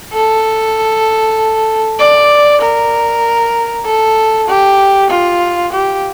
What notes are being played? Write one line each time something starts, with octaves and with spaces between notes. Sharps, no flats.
A4
D5
A#4
A4
G4
F4
G4